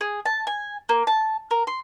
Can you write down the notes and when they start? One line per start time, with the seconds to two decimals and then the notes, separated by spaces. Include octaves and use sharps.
0.01 G#4
0.25 A5
0.47 G#5
0.89 A#3
1.07 A5
1.51 A#4
1.67 C6